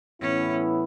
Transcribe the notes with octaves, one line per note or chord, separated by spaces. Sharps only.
A2 E3 B3 C#4 E4